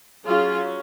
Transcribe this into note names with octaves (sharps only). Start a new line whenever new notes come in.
F#3 C#4 F4 G#4